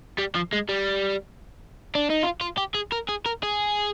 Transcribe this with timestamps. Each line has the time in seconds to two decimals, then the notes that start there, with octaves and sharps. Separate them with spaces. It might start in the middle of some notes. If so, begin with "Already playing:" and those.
0.18 G3
0.35 F3
0.53 G#3
0.69 G3
1.95 D4
2.10 D#4
2.23 F4
2.41 F4
2.58 G4
2.74 G#4
2.92 A#4
3.08 G#4
3.26 A#4
3.43 G#4